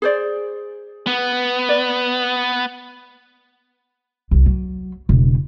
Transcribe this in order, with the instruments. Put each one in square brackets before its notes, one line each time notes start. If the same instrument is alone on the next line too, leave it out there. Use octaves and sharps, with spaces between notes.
[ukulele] G#4 C5 D5
[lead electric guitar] B3
[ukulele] D5
[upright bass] C2 D3
F#3
E1 C#3